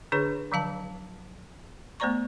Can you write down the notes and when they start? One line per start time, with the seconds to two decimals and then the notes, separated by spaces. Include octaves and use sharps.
0.12 D3 D4 G#4 B4 C#5 C#6
0.51 D3 F3 F#3 F5 A5
2.00 A3 B3 C5 D5 A#5 C#6